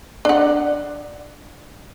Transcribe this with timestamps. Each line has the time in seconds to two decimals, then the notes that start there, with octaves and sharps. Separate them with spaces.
0.25 D4 F#5